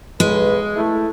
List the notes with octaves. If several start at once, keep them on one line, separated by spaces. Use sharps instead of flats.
B1 G#3 B4
A3 E4